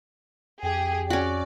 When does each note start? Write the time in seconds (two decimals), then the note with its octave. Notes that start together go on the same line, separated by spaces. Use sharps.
0.63 F2 G4 G#4 G5
1.10 C#4 F#4 D5